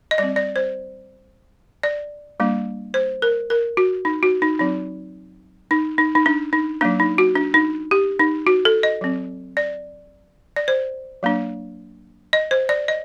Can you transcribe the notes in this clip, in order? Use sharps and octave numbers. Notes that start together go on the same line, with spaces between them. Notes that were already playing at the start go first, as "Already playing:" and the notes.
D#5
G3 C4 D5
D5
C5
D5
G3 A#3 D4
C5
A#4
A#4
F#4
D#4
F#4
D#4
F#3 C4 D#4
D#4
D#4
D#4
D4
D#4
F#3 A#3 D4
D#4
F#4
D4
D#4
G4
D#4
F#4
A4
D#5
F#3 C4
D5
D5
C5
F#3 A#3 D4
D#5
C5
D5
D#5